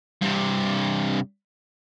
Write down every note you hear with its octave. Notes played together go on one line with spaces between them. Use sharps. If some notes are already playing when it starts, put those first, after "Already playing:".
G2 C3